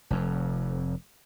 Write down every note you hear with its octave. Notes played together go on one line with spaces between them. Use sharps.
F1 F2